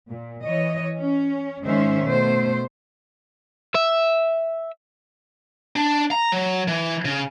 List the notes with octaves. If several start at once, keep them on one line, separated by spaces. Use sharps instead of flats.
A#2
E3 C#5 D#5
C#4
G#2 D#3 G#3 C#4 C5 E5
B2 A3 C5
E5
D4
A#5
F#3
E3
C#3